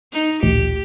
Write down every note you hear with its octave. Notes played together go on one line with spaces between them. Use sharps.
D#4
A1 D2 A#2 G4